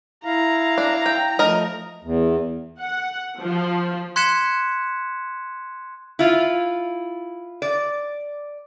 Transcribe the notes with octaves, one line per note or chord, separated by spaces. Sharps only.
E4 F5 A#5
D4
G5
F3 A3 A#4 D#5
E2
F#5
F3
C6 F#6 G#6 B6 C#7 E7
E4 F4
D5